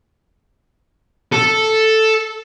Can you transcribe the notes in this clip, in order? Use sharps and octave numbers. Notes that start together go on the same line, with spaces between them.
A4